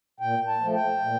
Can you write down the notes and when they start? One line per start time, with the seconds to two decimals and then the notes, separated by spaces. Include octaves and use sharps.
0.20 A#2 G5
0.47 A5
0.61 F3 A3
0.75 G5
1.02 A#2